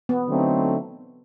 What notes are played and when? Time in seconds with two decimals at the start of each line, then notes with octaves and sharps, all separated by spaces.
0.09 B3
0.27 D3 F#3 A3 C4 D#4